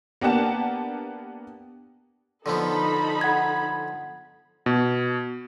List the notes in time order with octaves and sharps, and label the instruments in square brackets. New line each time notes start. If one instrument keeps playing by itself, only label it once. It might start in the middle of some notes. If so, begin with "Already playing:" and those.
[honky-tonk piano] A#3 B3 D4 G4 F#5 A5
[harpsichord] D3 F3 B3 [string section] D#4 A4 B5
[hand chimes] F#5 G#6
[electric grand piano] B2